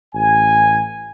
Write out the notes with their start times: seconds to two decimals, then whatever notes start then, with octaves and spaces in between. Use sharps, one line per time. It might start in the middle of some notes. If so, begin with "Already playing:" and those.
0.14 A1 G#5